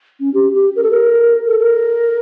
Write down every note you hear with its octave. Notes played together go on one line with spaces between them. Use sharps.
C#4
G4
G4
A#4
A4
A#4
A4
A#4